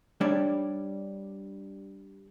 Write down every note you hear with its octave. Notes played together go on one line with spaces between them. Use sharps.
G3 D4 C#5 D5